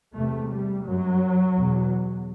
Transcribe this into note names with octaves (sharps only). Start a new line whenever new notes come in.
E2 C3 A3
G3
F#2 F#3
E2 B2